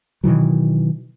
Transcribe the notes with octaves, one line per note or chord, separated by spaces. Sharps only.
B2 D#3 E3 F#3